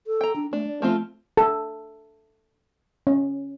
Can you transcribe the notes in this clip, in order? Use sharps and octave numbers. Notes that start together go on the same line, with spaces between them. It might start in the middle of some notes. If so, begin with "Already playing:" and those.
A4
G5 A#5
D4
A3 D4
D5
F3 A3 C4 F4
A4
C#4